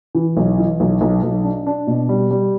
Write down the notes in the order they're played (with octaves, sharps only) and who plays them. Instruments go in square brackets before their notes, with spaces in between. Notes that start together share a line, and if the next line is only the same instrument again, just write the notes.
[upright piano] E3
B1
E3
B1
B1
B1
D4
D4
B2
G3
G3